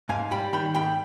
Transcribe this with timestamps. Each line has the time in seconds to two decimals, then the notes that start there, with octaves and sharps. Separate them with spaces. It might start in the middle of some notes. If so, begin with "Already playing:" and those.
0.09 G#2 F5 G#5
0.31 G3 G5 B5
0.53 D#3 G5 B5
0.74 G#2 G5 B5